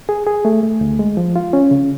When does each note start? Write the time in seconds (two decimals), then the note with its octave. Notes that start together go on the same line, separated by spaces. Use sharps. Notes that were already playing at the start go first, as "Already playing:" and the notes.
0.09 G#4
0.27 G#4
0.45 A3
0.63 A3
0.81 D2
0.99 G#3
1.17 F3
1.36 F4
1.53 C#4
1.71 C#3